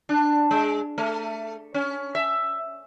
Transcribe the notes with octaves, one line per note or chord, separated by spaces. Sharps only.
D4
G#3
A3
C#4
E5